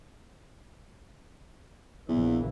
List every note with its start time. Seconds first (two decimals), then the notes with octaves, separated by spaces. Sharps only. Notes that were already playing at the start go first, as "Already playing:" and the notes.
2.08 A#1 E2 E3